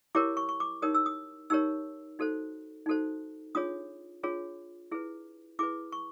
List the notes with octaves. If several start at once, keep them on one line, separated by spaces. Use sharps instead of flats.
E4 G4 A#4 C#5 D6
C#6
C#6
D6
D#4 G4 A#4 C#5 D#6
E6
D#6
D#4 G4 A#4 C#5 E6
D#4 F#4 A4 C5
D#4 F#4 A4 C5
D4 F4 G#4 C#5 D#6
D4 F4 G#4 C#5
E4 G#4 B4
E4 G#4 B4 D6
C#6